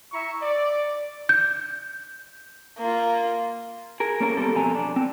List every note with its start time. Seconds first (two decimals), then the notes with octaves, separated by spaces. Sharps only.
0.12 E4 E5 A#5 C#6
0.42 D5
1.29 G6
2.78 A#3 F4
4.00 G#4 A#4
4.20 A#3 C#4 A4 A#4
4.37 G3 B3 C4 G4 A4
4.55 F2 B2 C4 A4 G#5 A#5
4.75 D4
4.96 C4